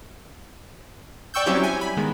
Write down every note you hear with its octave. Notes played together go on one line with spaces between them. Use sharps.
D5 G5 C#6 E6 G6
F#3 G3 C4 C#4 E4 G4
G#5
B5
D#3 G#3 B3